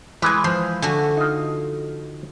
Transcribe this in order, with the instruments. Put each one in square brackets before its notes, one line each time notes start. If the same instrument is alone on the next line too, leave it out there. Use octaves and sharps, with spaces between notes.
[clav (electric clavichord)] E3 G#3 [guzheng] B4 G#5
[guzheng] F3
[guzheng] D3 A3 F#4 [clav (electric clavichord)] G#5
[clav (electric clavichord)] D#4 F4